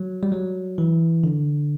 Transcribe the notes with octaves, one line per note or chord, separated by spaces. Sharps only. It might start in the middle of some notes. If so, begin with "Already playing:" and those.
Already playing: F#3
G3
F#3
E3
D3